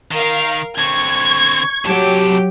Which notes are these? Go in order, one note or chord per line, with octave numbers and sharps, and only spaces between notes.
D#3 A#4 F5
D3 C4 C#6 G#6
C3 F#3 G4 A5